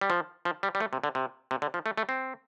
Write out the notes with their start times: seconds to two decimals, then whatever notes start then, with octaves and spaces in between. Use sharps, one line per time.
0.01 G3
0.10 F3
0.45 F3
0.63 G3
0.75 G3
0.80 A3
0.93 C3
1.04 D3
1.15 C3
1.51 C3
1.62 D3
1.74 F3
1.86 A3
1.98 A3
2.09 C4